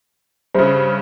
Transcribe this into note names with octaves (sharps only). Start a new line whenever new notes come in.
G2 C#3 C5 E5